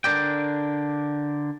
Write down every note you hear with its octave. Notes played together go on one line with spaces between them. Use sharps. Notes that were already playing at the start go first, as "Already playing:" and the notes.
D3 D4 A#4 D5 G5